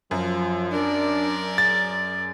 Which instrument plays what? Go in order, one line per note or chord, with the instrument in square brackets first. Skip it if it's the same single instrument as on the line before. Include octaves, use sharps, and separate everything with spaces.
[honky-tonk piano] F#2 [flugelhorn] F3
[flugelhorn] D4 [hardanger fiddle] A#4 D5
[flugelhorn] G#4 [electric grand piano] A6